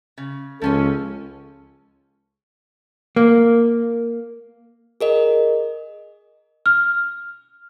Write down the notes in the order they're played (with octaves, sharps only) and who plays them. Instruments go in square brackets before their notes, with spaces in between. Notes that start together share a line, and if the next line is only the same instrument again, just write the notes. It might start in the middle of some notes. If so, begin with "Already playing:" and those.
[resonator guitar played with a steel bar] C#3
[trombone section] C#2 A4 [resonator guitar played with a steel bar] F3 C#4 G#5
[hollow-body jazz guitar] A#3
[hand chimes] G#4 A#4 D#5
[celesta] F6